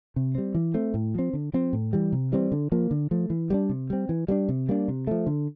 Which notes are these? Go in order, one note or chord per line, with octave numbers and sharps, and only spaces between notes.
C3
G3 C4
E3
A3 C4
A2
F3 C4
D3
F3 C4
A2
E3 G3
C3
E3 G3 C4
D3
F3 A#3
D3
F3 A3
E3
G3 A#3 D4
C3
G3 C4
E3
G3 A#3 D4
C3
G3 A#3 D4
C3
F3 A3
D3